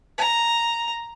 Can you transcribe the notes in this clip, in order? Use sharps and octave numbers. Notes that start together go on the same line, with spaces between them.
A#5